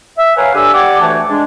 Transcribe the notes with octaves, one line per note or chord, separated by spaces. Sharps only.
E5
A#4 B4 C#5 F5 F#5 G#5
D3 G4 G#5 E6
G4 D5 F#5 G#5 D6
D2 E3 A3 C#5 A5
G#3 D4